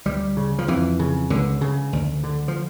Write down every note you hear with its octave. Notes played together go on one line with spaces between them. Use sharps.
D2 G3
C#3
F3
F2 E3
C#3
C#2 D3
C#3
D2
D3
F3